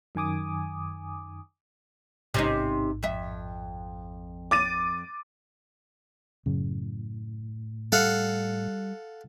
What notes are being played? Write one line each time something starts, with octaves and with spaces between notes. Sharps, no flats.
F#2 D#3 G#5 D6 D#6
A1 G#2 C3 C#4 D#4
F2 E5
D6 A6 D#7
F#2 A2 C#3
G3 A4 F5 F#5